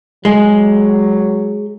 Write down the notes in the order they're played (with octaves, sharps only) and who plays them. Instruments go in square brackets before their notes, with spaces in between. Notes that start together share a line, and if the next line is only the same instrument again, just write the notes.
[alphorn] F#3 [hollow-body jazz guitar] G#3